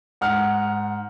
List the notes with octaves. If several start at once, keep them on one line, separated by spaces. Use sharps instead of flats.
G#2 F#5 F6